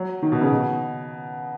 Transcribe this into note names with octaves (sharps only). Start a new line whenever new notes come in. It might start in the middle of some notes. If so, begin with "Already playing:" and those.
Already playing: F#3
D#3
B2
C#3
B2